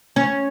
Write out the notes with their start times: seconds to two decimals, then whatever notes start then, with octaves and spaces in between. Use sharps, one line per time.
0.16 C#4